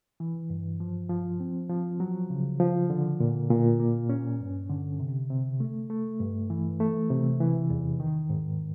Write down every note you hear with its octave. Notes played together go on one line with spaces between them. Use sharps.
E3
G2
F3
F3
C4
F3
F#3
C#3
F3
D3
A#2
A#2
A#3
C#4
G2
D3
C3
C3
A3
A3
G2
E3
A3
C3
E3
E2
D#3
G#2